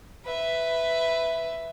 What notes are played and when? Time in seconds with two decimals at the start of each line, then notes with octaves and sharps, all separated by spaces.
0.25 B4 E5